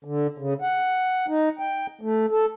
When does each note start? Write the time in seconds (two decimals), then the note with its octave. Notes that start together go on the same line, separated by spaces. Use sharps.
0.05 D3
0.38 C#3
0.62 F#5
1.28 D#4
1.59 G5
2.01 A3
2.31 A4